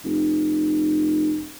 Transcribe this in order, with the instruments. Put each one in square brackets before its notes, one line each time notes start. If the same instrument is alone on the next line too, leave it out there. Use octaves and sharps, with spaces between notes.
[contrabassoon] F1